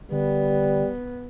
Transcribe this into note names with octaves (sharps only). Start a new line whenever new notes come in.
D3 G3 B3